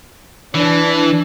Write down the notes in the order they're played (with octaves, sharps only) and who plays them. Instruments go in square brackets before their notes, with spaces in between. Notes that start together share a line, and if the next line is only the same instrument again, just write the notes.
[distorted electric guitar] E3 [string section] D4